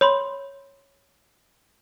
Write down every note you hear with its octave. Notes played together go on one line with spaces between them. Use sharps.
C#5 B5 C6